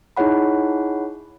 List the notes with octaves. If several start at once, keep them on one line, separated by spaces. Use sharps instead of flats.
D#4 E4 G#4 C#5 F#5 B5